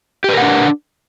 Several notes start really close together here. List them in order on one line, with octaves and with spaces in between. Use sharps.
G4 B4 A#4 F#5 D4